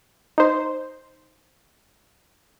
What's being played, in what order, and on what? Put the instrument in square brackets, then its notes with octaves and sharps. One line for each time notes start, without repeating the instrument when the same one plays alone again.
[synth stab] D#4 C5